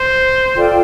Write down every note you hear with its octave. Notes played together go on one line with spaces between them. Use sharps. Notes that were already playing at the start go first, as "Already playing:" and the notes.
Already playing: C5
F4 A4 D5 G5